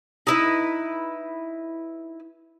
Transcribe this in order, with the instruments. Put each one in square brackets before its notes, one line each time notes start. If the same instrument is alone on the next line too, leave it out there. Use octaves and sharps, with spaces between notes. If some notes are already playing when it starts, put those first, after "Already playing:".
[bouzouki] D#4 E4 B4